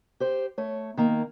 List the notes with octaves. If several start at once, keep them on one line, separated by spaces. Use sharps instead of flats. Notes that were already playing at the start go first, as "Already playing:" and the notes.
G4 C5
A3 C#5
D#3 A#3